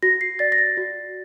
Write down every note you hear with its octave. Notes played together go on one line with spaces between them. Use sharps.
F#4 A#6
C7
D5 A6
A#6
A6
F#4